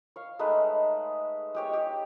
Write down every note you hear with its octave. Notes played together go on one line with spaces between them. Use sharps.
C#5 F5
G#3 A3 D#4 B4
G#3 G4 C#5
G4